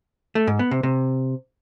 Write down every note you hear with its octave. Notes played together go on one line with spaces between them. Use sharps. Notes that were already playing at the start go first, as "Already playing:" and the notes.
A3
G#2
B3
C3
C3